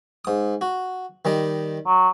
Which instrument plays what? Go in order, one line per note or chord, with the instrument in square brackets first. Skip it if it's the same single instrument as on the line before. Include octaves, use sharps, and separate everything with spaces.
[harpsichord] G#2 D#6
F#4
D#3 G3 D#5
[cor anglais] F#3